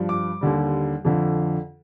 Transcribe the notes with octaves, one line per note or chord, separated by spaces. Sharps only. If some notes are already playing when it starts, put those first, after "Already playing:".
Already playing: G2 F3
D6
D#2 D3 G3
F2 D3 F3